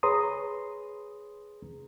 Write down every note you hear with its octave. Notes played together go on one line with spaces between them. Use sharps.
G#4 B4 C#5 A#5 C6 D#6